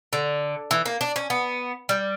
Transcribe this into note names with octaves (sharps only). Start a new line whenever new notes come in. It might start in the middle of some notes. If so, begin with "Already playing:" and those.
D3
E3
A#3
D4
C#4
B3
G3